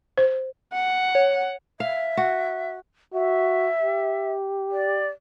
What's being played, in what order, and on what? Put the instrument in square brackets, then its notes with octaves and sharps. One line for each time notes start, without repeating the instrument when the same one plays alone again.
[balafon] C5
[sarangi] F#5
[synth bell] C#5
[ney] E5 [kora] F5
[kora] F#4
[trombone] F#4 [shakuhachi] E5
[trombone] G4
[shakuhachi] D5